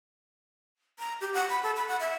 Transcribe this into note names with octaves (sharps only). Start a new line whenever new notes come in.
A#5
G4
F#5
B5
A4
B5
F#5
E5